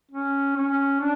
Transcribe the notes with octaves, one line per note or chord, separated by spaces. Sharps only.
C#4
C#4
D4